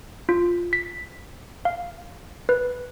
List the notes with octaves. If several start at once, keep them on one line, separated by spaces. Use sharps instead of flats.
F4
B6
F5
B4